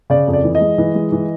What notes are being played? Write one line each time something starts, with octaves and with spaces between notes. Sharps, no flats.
C#3 D5
F2
D5
E3
D#5
G#3
E3
G#3
E3